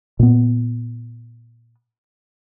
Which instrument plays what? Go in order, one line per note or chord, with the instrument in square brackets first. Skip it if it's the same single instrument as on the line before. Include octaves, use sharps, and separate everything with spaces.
[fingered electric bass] A#2 B3